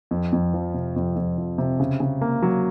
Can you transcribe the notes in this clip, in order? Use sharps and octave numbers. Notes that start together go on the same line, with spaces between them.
F2
F2
F3
C3
F2
F2
F3
C3
C#3
C#3
A#3
F#3